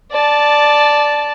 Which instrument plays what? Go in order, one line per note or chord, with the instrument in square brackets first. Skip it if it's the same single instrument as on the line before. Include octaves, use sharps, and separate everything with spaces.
[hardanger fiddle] D5 A5